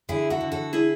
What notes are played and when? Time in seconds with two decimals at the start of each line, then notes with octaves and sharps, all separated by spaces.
0.09 D3 E4 G#4
0.30 F#4 A4
0.41 D3
0.52 F#4 A4
0.73 E4 G#4